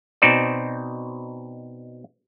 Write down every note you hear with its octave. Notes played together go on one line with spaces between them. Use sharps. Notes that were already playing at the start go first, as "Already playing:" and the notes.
B2 C4 D#4 C5 D5